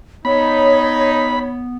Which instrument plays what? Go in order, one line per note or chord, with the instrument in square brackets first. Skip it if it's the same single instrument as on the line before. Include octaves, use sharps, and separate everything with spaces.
[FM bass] B3 [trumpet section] D#4 [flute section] C#5 [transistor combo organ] B5